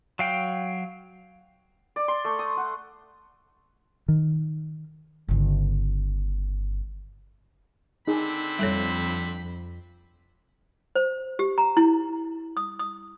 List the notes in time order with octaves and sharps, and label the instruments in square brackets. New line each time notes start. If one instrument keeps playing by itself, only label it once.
[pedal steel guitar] F#3 F5 G5
[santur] D5
C6
A3
D#6
F#5
[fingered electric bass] D#3
[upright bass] G1 C#3
[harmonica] D3 C4 B5 [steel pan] D#4 G#4
[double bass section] F2 [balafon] G3 A4 C#5
[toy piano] C5
G4
A#5
E4
D#6
D#6